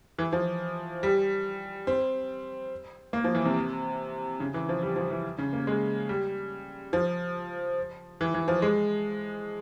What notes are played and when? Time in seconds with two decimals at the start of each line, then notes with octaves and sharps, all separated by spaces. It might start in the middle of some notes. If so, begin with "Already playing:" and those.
0.18 E3
0.33 F3
1.03 G3
1.87 C4
3.13 A#3
3.24 F3
3.35 E3
3.45 C3
4.40 C#3
4.54 E3
4.69 F3
4.82 G3
4.96 F3
5.11 E3
5.38 C#3
5.53 A#3
5.67 G#3
6.09 G3
6.93 F3
8.21 E3
8.34 E3
8.48 F3
8.62 G#3